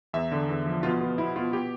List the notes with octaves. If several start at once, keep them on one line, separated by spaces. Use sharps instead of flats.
E2 E5
D3
E2
F3
B2 F4
B3 F4
B2 E4
B2 F4
B2 G4